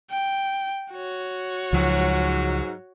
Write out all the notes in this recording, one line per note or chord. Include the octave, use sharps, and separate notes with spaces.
G5
F#4 C#5
C#2 G#2 F3 F#3